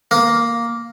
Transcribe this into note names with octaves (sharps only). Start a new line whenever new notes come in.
A#3